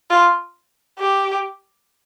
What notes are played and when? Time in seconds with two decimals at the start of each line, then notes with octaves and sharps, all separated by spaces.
0.10 F4
0.99 G4